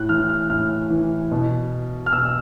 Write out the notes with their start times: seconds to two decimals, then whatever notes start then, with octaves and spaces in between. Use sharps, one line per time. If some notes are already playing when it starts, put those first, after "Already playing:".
Already playing: A2 F#6
0.09 E3 F6
0.29 F6
0.50 A2 F6
0.90 E3
1.31 B2
2.06 F6
2.13 B2 E6